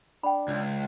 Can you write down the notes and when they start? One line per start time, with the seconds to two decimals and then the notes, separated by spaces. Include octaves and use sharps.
0.24 D4 G5 B5
0.48 C#2